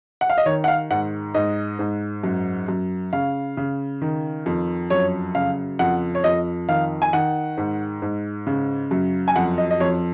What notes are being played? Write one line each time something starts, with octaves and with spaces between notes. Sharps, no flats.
F#5
F5
D#5
D#3 C#5
F#5
F5
G#2 F#5
G#2 D#5
G#2
F#2
F#2
C#3 F5
C#3
D#3
F2
F#2 C#5
C#3 F5
F2 F#5
C#5
F2 D#5
D#3 F5
G#5
D#3 F#5
G#2
G#2
C#3
F#2
G#5
F2 F#5
D#5
D#5
F2 C#5